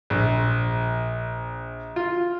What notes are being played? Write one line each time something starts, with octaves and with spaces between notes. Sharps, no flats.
A#1
F4